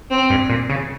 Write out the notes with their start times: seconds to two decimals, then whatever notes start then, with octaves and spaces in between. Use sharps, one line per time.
0.10 C4
0.30 G2
0.50 A#2
0.70 C#3